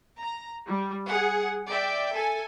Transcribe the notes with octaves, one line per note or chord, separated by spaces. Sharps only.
A#5
G3
G#4 F#5
D5 E5 G5
A4 G#5